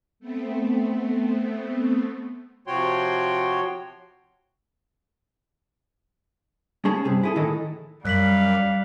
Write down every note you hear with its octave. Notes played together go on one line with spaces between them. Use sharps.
A3 B3 C4
C3 F3 F#4 C#5 G5 C6
C#4 G#4 A5
G2 C3 G#4
E4 G#4 A4
A2 D#3 E3 E4 A4 D#5
F#2 G3 F5 F#6 B6 F#7